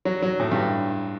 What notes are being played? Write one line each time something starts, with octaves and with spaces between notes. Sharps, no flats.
F#3
F#3
A2
G2